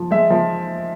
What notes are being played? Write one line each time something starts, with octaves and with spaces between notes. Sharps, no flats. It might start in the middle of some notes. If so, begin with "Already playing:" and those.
Already playing: F3
G#3 E5
F3